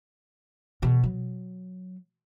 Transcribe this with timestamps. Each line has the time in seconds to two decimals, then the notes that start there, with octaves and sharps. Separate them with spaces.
0.82 B2 E3
1.03 F#3